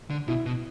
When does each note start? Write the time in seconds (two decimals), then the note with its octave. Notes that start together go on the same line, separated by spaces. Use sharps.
0.10 D3
0.28 B2 E4
0.46 B2